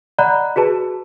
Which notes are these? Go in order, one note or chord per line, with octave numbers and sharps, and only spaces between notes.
D5 D#5 F#5 A#5 B5 F#6
F#4 G#4 B4 A5